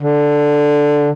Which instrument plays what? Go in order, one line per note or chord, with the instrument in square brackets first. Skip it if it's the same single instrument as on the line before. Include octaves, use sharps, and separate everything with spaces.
[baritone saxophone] D3